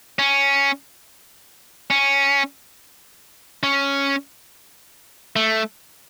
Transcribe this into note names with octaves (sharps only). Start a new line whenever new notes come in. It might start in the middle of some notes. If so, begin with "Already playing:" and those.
C#4
C#4
C#4
A3